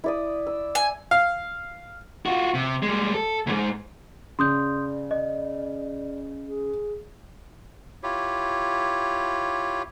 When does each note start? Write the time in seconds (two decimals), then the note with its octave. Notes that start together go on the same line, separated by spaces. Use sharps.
0.04 E4 D5 D#6
0.47 E6
0.75 G#5
1.11 F5
2.26 F4 F#4
2.54 C3
2.83 G3 G#3
3.14 A4
3.47 D2 G#2
4.39 C#3 D5 C6 D#6 G6
5.11 D#5
6.47 G#4
8.03 E4 F4 G4 C#5